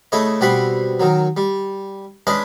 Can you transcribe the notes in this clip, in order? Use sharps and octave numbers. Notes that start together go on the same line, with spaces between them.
C#3 A3 E4 C#5 D#5
B2 G3 C4 F#5 B5 C6
D#3 F#3
G3
G#3 C#4 D4 B4 D#5